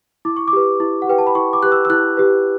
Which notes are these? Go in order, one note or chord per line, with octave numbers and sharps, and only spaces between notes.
E4 D6
C#6
D6
G4 B4
E4
F#5
G4 B4 G5
A5
B5
E4 C#6
D6
G4 B4 F#6
E6
E6
E4 F#6
G4 B4